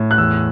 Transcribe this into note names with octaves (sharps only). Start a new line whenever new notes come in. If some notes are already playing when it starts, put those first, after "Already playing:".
Already playing: A2
F#6
E2 E6